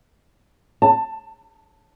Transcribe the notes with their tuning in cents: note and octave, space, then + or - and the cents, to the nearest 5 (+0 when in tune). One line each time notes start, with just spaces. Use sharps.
A5 +15